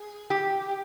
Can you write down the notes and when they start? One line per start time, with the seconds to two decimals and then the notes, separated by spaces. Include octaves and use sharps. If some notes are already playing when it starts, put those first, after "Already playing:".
Already playing: G#4
0.30 G4